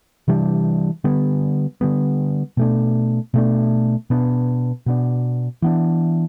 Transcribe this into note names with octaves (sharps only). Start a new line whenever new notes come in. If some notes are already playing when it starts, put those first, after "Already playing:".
C3 E3 G3 D4
D3 G3 B3
D3 G3 B3
B2 A3 D4
B2 A3 D4
B2 B3 D4
B2 B3 D4
E3 B3 D4